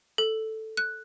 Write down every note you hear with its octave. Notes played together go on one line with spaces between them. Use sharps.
A4
F#6